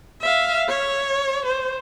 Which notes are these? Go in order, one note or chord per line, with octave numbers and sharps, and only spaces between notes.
E5 F5
C#5
C5